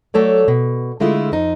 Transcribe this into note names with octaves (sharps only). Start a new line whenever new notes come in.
F#3 A3 A4 C#5 D5
B2
D3 G#3 A3 E4 F4
F2 D#4